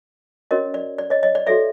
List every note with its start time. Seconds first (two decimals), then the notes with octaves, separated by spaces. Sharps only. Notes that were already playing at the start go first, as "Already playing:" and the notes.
0.51 C#4 F#4 A#4 C#5 D#5
0.74 D5
0.98 D5
1.10 C#5 D#5
1.23 C#5 D#5
1.35 D5
1.47 F#4 A4 C#5 D5 E5